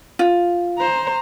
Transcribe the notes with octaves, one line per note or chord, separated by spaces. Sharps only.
F4
C5 A#5